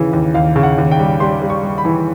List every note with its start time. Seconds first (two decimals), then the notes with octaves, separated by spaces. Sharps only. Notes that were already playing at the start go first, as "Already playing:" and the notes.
Already playing: D#2 C#3 E3
0.13 D#2
0.34 D#2 F5
0.56 C#3
0.63 F#5
0.78 D#2
0.91 G5
0.99 G3
1.20 G3 C6
1.42 G3
1.50 C#6
1.63 G3
1.78 B5
1.85 E3